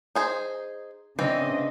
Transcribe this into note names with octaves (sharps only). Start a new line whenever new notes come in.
D#4 G#4 C5
C#3 E3 C4 D4 F4 D#5